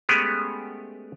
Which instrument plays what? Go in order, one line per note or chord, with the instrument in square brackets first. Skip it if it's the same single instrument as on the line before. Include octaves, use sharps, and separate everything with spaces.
[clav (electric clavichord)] G#3 A3 B3 C#4 G4 G#4